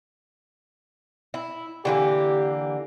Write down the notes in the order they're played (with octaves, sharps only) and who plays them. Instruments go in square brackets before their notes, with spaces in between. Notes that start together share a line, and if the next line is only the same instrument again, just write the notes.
[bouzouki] E4
[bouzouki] D3 E3 A#3 [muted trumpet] G4